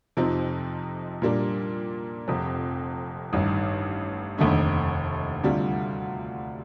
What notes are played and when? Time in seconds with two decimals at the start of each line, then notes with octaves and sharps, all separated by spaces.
0.17 F2 C3 F3 C4 D#4
1.22 A#2 G3 A#3 D4
2.28 F1 F2 C3
3.33 A1 G2 D#3
4.38 F1 D#2 D3 A3 D#4
5.43 D2 C3 G3 D4 F4